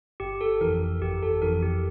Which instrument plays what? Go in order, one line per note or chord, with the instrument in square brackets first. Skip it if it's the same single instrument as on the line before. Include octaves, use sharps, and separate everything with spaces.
[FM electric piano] G1 [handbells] G4
[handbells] A4
[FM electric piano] F2 E3 [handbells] A#4
[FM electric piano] G1 [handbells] G4
[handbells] A4
[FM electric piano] F2 E3 [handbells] A#4
[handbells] G4